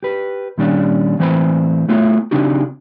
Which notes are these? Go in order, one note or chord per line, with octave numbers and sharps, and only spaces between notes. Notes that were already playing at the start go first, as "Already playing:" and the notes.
G4 B4
A#2 D#3 G3 C#4 D4
A2 E3 C4 C5 E5 B5
A3 B3 E4 F4 C#5
C#3 C4 D4 D#4 F#4 G4